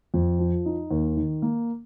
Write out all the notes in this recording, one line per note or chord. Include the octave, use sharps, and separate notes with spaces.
F2
F3
D#4
D#2
D#3
A#3